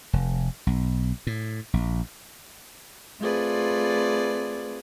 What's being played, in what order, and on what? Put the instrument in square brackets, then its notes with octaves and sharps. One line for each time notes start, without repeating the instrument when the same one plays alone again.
[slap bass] F1
B1
A2
A#1
[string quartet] A3 C4 F4 G#4 B4 D5